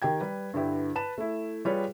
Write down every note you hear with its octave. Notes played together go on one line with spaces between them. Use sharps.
D#3 G4 G5 G#6
G3 B4
G2 D3 E4 G4 B4
B4 A5 E7
A3 E4
G3 F4 G4 G#4 B4 C#5